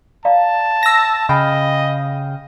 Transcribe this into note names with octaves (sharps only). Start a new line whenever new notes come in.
D5 F5 A5 A#5
E6 A#6
C#3 D#5 F5 G5 B5